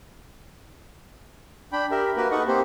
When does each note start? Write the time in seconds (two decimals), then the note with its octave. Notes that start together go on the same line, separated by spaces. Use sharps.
1.72 D4 G5 B5
1.91 G4 A#4 E5
2.17 A#3 F#4 A#4 B4
2.31 D#4 A4 B4 D#5 F#5 C#6
2.48 A#3 C4 G4 C5